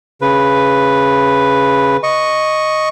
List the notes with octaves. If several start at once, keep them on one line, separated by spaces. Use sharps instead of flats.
C#3 B4
D#5 C#6